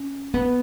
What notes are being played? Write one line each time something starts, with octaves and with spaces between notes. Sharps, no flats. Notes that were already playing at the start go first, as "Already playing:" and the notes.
Already playing: C#4
B3